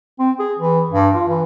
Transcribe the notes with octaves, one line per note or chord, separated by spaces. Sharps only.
C4
G#4
E3
G2
F4
E3